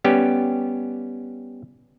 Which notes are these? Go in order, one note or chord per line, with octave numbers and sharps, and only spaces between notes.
G3 B3 C#4 G4